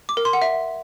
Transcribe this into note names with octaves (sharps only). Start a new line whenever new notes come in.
D6
A#4
C6
F#5
E5